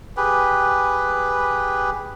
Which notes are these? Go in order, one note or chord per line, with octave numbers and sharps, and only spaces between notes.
G4 G#4 B4